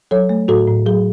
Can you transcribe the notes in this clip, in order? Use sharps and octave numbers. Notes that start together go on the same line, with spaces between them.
F#3 A4 C#5
A3
A2 F#4 A4
A2
F#3 G#4